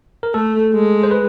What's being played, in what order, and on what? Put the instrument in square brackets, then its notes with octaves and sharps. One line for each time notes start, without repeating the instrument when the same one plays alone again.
[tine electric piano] A#4
[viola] A3 [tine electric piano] A4
[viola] G#3
[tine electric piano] C5
B4